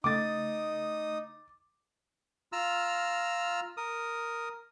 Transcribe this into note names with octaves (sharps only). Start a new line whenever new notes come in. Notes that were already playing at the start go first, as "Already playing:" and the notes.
C#3 A3 D#4 D6 D#6 A6
F4 A#5 E6 F6
A#4 D#6